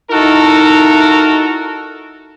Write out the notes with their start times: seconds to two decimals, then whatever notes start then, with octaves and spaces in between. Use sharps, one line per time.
0.11 D#4 E4 F#4 A4 A#4